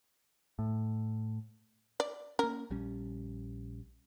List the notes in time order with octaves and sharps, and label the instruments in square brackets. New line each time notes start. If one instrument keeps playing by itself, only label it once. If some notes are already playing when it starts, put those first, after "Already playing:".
[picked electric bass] A2
[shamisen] D5
[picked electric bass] A#3 C#4 [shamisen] A#4
[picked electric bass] A#1 G3 C#4